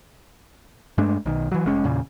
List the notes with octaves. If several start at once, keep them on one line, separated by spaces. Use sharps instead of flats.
G2 G#3 A3 D4
B1 D#3
E3 F#3
F1 G#3 C#4
E2 A#2 C#3